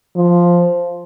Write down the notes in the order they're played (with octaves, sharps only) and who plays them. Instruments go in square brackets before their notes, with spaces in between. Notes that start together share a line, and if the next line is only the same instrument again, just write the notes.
[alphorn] F3